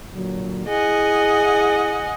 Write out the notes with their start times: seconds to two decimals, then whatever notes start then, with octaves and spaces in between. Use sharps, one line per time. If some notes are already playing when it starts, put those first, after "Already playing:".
0.14 A#2 D3 F#3
0.67 E4 G#4 D#5 F#5 G#5